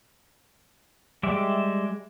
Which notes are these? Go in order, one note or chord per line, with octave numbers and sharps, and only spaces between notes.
G3 G#3 D5 E5